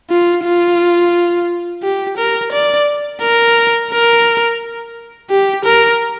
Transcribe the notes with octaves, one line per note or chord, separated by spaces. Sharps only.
F4
F4
G4
A#4
D5
A#4
A#4
G4
A#4